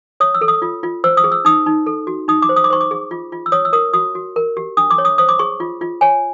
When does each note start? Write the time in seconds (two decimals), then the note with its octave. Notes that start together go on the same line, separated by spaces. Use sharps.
0.20 C#5 D#6
0.35 E6
0.41 A4
0.48 D#6
0.62 F4
0.83 F4
1.04 C5 E6
1.17 D#6
1.24 G#4
1.32 E6
1.45 D#4 D#6
1.66 D#4
1.86 A4
2.07 F#4
2.28 D#4 D#6
2.42 D6
2.49 C5
2.56 D#6
2.64 D6
2.70 C5 C#6
2.81 D6
2.91 G#4
3.11 F4
3.32 F4
3.46 E6
3.52 C#5 D#6
3.65 E6
3.73 A#4 D#6
3.93 F#4 D#6
4.15 F#4
4.36 A#4
4.57 G4
4.77 D4 D#6
4.91 D6
4.98 C#5
5.05 D#6
5.18 C5 D#6
5.29 D6
5.39 G#4 C#6
5.60 F4
5.81 F4
6.01 C#5 G#5